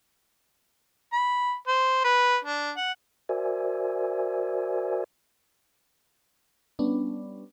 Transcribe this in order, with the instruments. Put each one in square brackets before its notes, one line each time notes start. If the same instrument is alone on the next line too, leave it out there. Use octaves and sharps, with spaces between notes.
[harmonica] B5
C5
B4
D4
F#5
[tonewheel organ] F#4 A#4 C5 D5 E5 G#5
[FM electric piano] G3 B3 C#4 D4